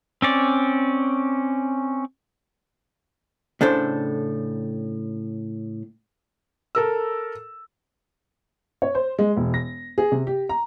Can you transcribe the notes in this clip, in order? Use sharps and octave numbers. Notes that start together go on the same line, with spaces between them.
C4 C#4 D5
A2 C#3 D4 A4 C5
A4 A#4 E6
C#5
C5
G#3
E1
A#6
G#4
C3
G4
A#5